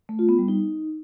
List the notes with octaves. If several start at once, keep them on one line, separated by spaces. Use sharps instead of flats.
A3
F4
B3
G3
D#4